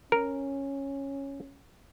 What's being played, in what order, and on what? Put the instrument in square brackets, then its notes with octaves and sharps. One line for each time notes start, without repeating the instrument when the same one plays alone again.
[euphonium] C#4 [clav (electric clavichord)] A#4